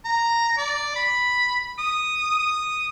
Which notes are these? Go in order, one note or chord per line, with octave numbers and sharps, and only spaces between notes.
A#5
D5
B5
D#6
D#6